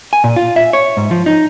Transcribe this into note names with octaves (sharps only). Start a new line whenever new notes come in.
G#5
A#2
F4
E5
C#5
G#2
F3
D#4